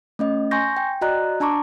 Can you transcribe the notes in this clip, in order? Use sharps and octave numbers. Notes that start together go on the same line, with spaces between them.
A3 C#4 D#5
G#5 C6 C#6 G6 A#6
G5
F#4 D5 D#5 A#5 F#6
D4 A5 A#5 C#6 D6